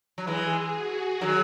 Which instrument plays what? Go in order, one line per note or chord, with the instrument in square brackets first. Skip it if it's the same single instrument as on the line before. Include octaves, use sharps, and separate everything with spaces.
[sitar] F#3
[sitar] E3 G#3 [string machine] G#4
[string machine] F#4
[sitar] D#3 F#3